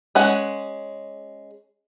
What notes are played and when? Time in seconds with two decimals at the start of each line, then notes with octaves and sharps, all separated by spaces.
0.15 G#3 C#4 F#5